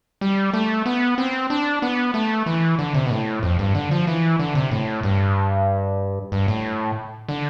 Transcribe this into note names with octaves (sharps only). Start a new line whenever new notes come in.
G3
A3
B3
C4
D4
B3
A3
E3
D3
C3
B2
A2
F2
G2
D3
F3
E3
D3
C3
A2
G2
G2
A2
D3